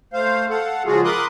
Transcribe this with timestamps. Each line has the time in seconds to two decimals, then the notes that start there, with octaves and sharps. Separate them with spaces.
0.13 A3 C5 F5
0.50 A4 F5 F#5
0.86 C#3 F3 G#3 F4 F#4 G#4
1.04 A#4 B5 C6 D6 D#6 F#6